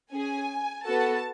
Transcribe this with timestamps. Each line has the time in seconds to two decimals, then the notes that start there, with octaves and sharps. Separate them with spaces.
0.12 C#4 G#4 G#5
0.85 B3 F#4 A4 A5